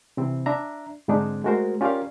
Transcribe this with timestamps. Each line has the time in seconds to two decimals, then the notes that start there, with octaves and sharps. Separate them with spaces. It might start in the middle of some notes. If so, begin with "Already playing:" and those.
0.17 C3 E3 C4
0.46 D4 E5 A#5
1.08 G#2 D3 G#3 C4 D4 D#4
1.44 G#3 A3 F#4 A#4 C5
1.81 C#4 F4 G4 A#4 D5 F5